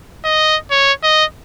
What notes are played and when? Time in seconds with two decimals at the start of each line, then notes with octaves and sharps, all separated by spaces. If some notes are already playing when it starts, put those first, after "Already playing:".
0.24 D#5
0.71 C#5
1.03 D#5